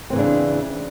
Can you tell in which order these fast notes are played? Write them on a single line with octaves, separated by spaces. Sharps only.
C4 E3 C#3 D4